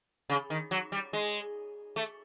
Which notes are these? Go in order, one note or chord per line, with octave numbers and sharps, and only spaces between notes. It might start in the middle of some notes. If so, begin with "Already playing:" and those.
C#3
D#3
F#3
G3
G#3
A3